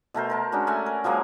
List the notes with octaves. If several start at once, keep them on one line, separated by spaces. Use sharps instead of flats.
B2 A3 A#4 C5
A#4 A5 A#5
G#3 C#4 D4 F#4
A3 E5 F#5 G#5
A#4
F3 F#3 G#3 A#3